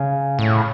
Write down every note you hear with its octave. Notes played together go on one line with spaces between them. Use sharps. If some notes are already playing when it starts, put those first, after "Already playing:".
Already playing: C#3
A2